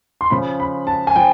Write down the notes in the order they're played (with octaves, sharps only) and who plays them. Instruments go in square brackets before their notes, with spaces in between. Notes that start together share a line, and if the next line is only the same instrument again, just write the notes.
[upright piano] C6
C#3 F3 B5
B5
A5
G#5
F3 G5